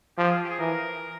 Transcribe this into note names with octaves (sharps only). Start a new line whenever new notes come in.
F3 G4
G#4
G4
G#4
E3 A#4